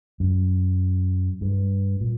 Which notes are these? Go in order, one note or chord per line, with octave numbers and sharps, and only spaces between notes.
F#2
G2
A#2